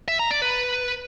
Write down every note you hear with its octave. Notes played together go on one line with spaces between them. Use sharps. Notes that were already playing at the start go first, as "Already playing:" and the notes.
E5
A#5
D5
B4